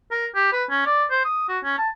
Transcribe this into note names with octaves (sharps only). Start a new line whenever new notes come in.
A#4
G4
B4
C#4
D5
C5
D#6
F#4
C#4
A5